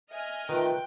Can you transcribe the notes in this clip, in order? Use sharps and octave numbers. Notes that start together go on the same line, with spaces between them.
D#5 E5 G#5 F6
D#3 A3 F4 B4 G5